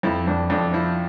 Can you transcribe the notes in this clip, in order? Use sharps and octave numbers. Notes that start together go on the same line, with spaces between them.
F2 E4
F2 D4
F2 D4
F3 E4